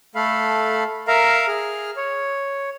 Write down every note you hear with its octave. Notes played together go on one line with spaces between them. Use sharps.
A3 A4 F5 B5
A#4 E5 F5 A#5
G#4 F6
C#5